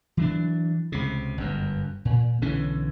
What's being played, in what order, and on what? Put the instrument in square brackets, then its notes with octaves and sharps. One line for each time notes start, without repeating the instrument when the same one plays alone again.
[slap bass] E3 F#3 D4
C#2 C3
G1 F#2
A#2
B1 D3 E3 C#4